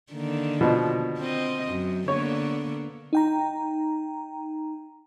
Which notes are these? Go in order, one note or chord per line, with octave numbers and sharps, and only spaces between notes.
D3 D#3 A#3
B2 F3
C4 D#5
F#2
D3 A#3 B3 C#5
D#4 G5 A#5